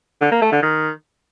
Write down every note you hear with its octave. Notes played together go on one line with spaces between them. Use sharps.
D3
A#3
A3
D3
D#3